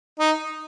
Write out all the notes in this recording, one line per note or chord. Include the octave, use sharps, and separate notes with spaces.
D#4